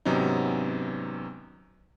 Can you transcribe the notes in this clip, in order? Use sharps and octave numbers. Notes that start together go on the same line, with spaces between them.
G#1 C3 F#3 B3 C#4 D#4